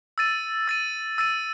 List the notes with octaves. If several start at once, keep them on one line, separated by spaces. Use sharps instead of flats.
E6 A6 D#7
E6 A6 D#7
E6 A6 D#7